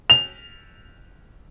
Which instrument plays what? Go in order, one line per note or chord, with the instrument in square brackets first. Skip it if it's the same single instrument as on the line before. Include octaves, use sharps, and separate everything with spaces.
[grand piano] F7